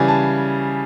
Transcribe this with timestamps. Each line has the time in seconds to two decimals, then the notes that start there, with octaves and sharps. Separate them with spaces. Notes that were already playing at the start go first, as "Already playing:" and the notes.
Already playing: C#3 E3 G3 G#5
0.08 A5